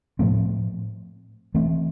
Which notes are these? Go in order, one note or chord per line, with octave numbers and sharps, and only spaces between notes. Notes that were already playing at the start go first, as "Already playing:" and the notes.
A2 F3 A3 C4
E3 A3 C4